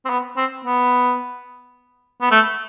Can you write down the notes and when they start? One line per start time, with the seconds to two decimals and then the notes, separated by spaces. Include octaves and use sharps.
0.05 C4
0.09 B3
0.37 C4
0.65 B3
2.22 B3
2.31 A3